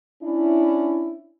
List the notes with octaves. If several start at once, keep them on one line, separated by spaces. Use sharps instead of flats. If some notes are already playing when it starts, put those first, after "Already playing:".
C#4 D4 E4